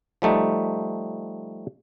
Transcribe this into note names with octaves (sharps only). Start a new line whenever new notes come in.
F3 G3 A3 D#4